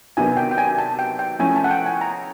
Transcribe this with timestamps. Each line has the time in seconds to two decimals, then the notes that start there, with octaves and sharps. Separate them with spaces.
0.17 C3 D#3 F#3 B3 D4 G#5
0.37 G5
0.51 G5
0.58 G#5
0.78 A5
0.99 G5
1.19 G5
1.39 F3 A3 C#4 E4 G#5
1.56 A5
1.64 F#5
1.71 G5
1.86 G#5
2.01 A#5